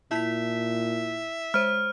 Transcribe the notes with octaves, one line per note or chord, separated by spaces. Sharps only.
A#2 E4 E5 B6
G#3 C5 F6